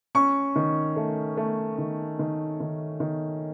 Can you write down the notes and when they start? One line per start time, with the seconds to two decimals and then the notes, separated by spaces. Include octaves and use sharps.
0.15 C#4 C#6
0.56 D#3
0.96 A3
1.37 A3
1.78 D#3
2.19 D#3
2.60 D#3
3.00 D#3